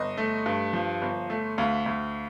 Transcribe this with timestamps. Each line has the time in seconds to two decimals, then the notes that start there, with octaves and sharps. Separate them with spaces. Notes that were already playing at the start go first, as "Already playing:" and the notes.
Already playing: G1 D#5
0.18 A3
0.46 G2
0.73 F3
1.02 G1
1.30 A3
1.58 D2 F5
1.86 D2